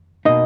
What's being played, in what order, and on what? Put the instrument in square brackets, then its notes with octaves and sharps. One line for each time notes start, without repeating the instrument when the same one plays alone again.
[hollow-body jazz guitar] B2 A#3 D#4 [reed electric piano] D#5